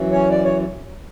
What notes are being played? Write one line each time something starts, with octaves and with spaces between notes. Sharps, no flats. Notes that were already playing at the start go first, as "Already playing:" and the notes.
Already playing: F#2 E3
C#4 C#5
D5
C#5